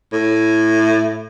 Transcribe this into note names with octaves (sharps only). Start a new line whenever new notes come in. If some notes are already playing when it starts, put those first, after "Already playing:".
A2